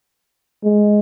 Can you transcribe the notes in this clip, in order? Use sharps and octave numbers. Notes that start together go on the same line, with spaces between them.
G#3